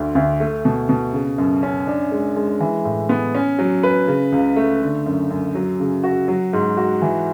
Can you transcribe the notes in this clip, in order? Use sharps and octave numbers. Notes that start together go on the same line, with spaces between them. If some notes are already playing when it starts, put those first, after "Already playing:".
Already playing: D2 D3
D2
A3
B2
B2
C#3
F#2
C#4
D4
G#3
G#3
E3
A2
B3
C#4
F#3
B4
C#3
C#2
A3
D3
F#2
F#2
F#3
C#3
F#4
F#3
G#2
F#4
E3